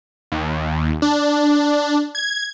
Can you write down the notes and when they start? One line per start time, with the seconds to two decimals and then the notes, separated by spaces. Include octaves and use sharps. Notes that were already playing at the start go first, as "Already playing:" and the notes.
0.32 D#2
1.02 D4
2.15 G#6